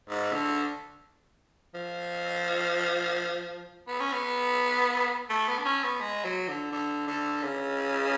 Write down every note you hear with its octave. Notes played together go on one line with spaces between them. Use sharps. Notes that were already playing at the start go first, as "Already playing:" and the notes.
G#2
D3
F3
B3
C#4
B3
A3
B3
D4
C#4
B3
G#3
F#3
D3
D3
D3
C#3